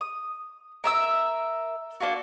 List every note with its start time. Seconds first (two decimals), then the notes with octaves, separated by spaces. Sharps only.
0.01 D#6
0.84 A#4 E5 E6
2.00 A#3 D4 F4 F#4